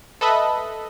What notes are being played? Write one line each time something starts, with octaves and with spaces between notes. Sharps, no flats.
A4 B4 D#5 E5 B5